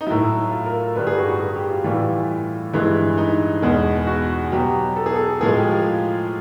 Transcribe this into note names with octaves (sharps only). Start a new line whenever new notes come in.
D#4
A2 F#3 E4
F4
A#4
G2 D3 G3 B4
G#4
F#4
F#4
G#4
G4
F4
A2 E3 G3 F4
G2 E3 G#3 E4
D#4
E2 B2 G#3
F#4
B2 F#3 G4
A4
G#4
A4
A2 F3 G#3 G#4
G4
F4